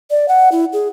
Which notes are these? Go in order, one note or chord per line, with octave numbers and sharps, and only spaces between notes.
D5
F#5
E4
G#4